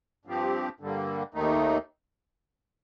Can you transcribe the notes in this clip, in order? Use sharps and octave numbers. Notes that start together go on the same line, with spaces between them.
G2 F3 C4 G4
G2 D3 G3 A#3
D#2 D#3 A3 D#4